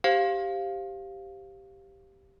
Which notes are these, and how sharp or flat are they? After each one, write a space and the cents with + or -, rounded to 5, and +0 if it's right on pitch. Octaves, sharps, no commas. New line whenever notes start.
G4 +0 C5 +0 F5 +0